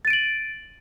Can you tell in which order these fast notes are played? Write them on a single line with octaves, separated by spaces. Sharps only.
A6 D#7 D7 F#7